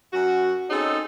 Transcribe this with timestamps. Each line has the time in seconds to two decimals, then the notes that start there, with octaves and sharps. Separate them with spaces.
0.13 F#2 F#4
0.69 C4 C#4 D#4 G#4 A4